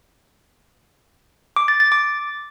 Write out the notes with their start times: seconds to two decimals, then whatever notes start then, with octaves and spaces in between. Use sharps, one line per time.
1.56 D6
1.68 A6
1.80 A6
1.92 D6